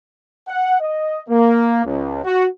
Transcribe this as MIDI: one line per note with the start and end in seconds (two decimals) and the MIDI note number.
0.48 0.76 78
0.81 1.22 75
1.29 1.83 58
1.85 2.24 37
2.24 2.46 66